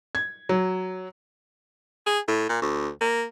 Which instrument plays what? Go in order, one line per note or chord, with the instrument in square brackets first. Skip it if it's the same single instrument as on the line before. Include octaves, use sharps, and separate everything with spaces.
[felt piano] G#6
F#3
[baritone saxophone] G#4
A2
A#2
D2
A#3